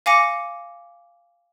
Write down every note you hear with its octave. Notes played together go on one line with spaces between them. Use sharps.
F5 G#5 D6 A#6 C#7